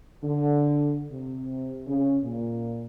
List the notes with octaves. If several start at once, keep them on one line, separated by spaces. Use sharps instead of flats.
D3
C3
C#3
A#2